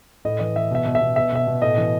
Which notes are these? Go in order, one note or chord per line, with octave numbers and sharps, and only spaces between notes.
A2 D#5
E3 D#5
E3 E5
B2 E5
B2
E5
B2
B2 E5
B2 E5
B2
A2 D#5
E3